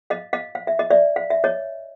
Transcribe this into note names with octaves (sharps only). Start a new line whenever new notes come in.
D#5 F5
D#5 F5
F5
E5
D#5
D5 E5
F5
E5
C#5 D#5